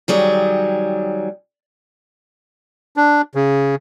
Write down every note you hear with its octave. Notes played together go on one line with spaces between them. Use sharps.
D#3 F#3 G3 G#4
D4
C#3